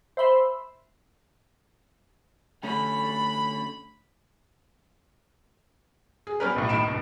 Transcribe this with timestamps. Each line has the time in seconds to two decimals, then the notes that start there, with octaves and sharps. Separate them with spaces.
0.17 C5 E5 B5 C6 E6
2.63 D3 A3 C#4 B5
6.27 G#4
6.40 G3 B3 C#4 A#4 B4
6.56 B1 A2 B3
6.69 A2 D#3 B5 D7 E7
6.88 C2 G2